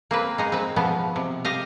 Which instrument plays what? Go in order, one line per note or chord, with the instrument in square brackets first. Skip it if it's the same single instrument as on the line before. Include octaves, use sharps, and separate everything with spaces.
[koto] A#3 C4 B4
G#3 D#4
C4 B4
B2 F3 B3
C3
G4 D#5 F5